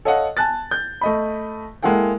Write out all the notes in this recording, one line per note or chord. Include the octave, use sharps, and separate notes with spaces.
A4 C#5 D#5 F5 F#5
G#5 A5 F#6 A6
G6
A3 D#5 B5
G#3 A#3 E4 A4 F#5 G5